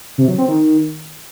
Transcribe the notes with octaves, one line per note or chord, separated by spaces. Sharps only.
C3
F#3
C4
D#3